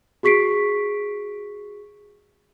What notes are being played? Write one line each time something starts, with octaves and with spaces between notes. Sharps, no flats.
F#4 G#4 C#6 B6 C7 D7